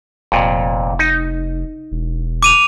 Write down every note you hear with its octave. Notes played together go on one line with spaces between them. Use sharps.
F1 F2 A#2
D#4
E1
D6 D#7 F7